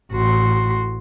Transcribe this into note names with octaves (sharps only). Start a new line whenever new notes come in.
A1 F#4 C6